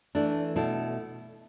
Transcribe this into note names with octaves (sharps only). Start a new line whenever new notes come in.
E3 A3 D4
B2 A3 E4 A4